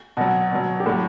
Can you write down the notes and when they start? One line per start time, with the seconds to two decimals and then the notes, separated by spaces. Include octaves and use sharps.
0.17 B2 F#3 F#4
0.51 B2 F#3
0.80 G4
0.86 A2 F#3 A4